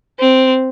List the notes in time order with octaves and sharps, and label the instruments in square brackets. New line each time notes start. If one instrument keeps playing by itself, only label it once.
[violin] C4